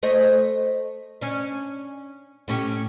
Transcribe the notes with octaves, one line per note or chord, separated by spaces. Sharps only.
A3 C5 D#5
C#4 D4
A2 C#4 G4